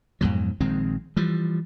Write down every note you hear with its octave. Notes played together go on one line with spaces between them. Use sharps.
F2 G#2 B2 F#3
A#1 D#3 G#3 C4
E3 F3 G3